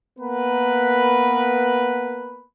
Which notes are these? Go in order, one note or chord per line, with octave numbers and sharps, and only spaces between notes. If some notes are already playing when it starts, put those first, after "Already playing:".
A#3 B3 A#4 B4